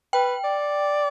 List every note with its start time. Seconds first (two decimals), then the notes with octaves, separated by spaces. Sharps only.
0.13 B4 G5
0.44 D5